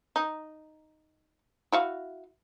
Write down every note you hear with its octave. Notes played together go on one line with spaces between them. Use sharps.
D#4
E4 F#4 F5